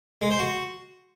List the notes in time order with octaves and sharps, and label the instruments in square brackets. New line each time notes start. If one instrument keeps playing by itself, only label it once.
[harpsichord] G#3
C5
F#4